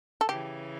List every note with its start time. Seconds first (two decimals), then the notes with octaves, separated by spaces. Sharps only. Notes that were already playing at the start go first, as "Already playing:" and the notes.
0.21 A4
0.29 C#3 E3 G4